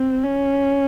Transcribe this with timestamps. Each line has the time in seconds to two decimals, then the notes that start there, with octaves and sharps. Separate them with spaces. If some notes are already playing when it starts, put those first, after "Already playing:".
Already playing: C4
0.23 C#4